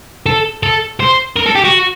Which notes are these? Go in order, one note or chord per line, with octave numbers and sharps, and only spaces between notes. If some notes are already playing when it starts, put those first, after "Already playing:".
A4
A4
C5
A#4
A4
G4
F#4